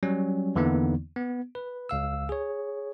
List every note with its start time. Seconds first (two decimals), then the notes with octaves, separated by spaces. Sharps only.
0.03 F#3 G3 C#4
0.56 E2 D3 E3 A#3 B3 D#4
1.16 B3
1.55 B4
1.89 C#2 F5 E6
2.29 G#4 C#5